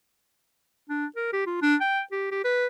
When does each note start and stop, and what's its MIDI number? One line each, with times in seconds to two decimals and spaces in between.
0.89 1.06 62
1.16 1.28 70
1.33 1.45 67
1.47 1.62 65
1.62 1.76 62
1.81 2.01 79
2.12 2.27 67
2.31 2.41 67
2.44 2.67 71